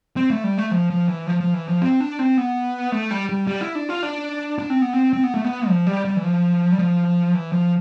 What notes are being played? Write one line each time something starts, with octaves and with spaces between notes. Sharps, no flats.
C4
A3
G3
A3
F3
F3
E3
F3
F3
E3
F3
C4
D4
C4
B3
A3
G3
G3
G3
E4
D4
F4
D4
D4
C4
B3
C4
C4
B3
A3
B3
F3
G3
G3
E3
F3
G3
F3
E3
F3